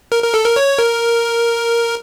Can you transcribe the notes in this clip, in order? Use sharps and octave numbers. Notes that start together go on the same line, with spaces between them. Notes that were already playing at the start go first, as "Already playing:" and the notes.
A#4
A#4
A4
A#4
C#5
A#4